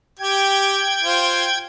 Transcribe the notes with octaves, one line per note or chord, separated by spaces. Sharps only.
G4 G5 G#6
F4 C5